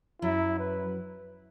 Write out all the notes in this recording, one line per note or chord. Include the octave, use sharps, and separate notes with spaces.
F#2 F#3 E4
B4